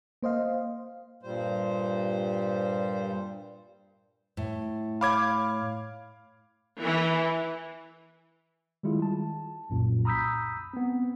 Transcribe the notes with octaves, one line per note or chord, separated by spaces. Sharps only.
A#3 C5 D#5 F5
G2 A#2 G3 C5
A2
C#5 F5 B5 D6 G#6
E3
D#3 G3 G#3 E4 F4 G#4
A5
C2 F#2 A#2
A#5 B5 D#6 E6 G6 B6
B3 C4